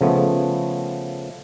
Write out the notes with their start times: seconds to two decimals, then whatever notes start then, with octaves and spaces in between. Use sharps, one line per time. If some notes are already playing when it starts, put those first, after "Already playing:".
0.01 C#3 F3 A3 B3